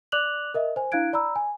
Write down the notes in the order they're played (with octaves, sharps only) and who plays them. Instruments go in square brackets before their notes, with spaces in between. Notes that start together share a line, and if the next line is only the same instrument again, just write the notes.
[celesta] D5 D6 F#6 F7 F#7
A#4 D#5 E5
C5 G#5
D4 E4 F5 F#6 G#6 D7
D5 A#5 B5 E6
G#5